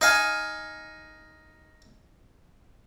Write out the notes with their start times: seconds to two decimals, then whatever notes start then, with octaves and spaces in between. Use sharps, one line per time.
0.01 D#4 F5 G#5